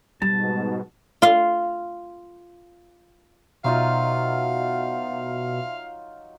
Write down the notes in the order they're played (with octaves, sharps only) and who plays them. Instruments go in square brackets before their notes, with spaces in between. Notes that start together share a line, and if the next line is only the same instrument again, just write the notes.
[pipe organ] G#2 B2 [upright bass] G3 [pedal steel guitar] A5
[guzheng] F4 F5
[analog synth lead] B2 [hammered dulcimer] F#3 D#4 F4 [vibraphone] E5 C6 [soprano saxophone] F5